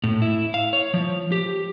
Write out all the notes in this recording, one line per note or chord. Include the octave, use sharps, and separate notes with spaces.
A2
E4
F5
C#5
F3
G4